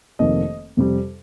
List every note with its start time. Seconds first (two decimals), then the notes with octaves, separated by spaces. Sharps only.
0.19 F1 F2 D#3 A#3 D#5
0.77 F2 C3 G3